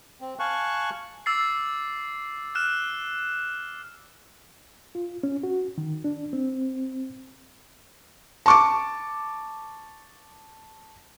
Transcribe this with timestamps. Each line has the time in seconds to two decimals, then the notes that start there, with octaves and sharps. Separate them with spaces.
0.21 C4
0.39 F5 G#5 A5 C#6 F#6
1.26 D6 E6 A6 C7
2.55 F6 F#6 E7
4.95 F4
5.23 C#4
5.43 F#4
5.78 D#3
6.04 D4
6.33 C4
8.46 A5 C#6 D6